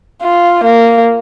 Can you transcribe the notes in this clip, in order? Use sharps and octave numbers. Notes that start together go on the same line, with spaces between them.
F4
A#3